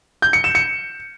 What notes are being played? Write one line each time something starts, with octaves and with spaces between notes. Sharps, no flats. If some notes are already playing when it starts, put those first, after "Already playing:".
G6
C#7
E7
C#7